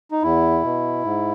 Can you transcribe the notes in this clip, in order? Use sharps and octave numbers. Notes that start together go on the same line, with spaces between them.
D#4
E2 E4
B2
G#2